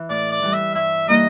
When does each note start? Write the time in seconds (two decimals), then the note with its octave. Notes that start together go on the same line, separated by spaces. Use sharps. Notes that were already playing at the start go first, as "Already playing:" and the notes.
Already playing: E3
0.10 A2 D5
0.31 D5
0.42 E3 G3
0.54 E5
0.75 G2 E5
1.08 E3 G3 A#3 D#4 D#5